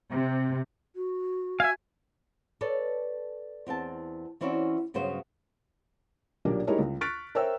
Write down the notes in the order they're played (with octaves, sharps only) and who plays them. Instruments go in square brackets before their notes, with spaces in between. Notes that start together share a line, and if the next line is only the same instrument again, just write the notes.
[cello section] C3
[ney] F#4
[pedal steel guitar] E5 F5 [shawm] G#5
[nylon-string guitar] A4 B4 C#5 D5
E2 C4 G5 A5
E3 C4 C#4 E4 F#4 D5
G2 C#3 F#3 B3 C5
[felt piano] B1 A#2 A#3 D4 G4 A#4
G3 G#3 D#4 E4 A#4 C#5
C#2
C#6 F6 F#6 A6 B6 D7
A#4 C5 C#5 E5 G5 E6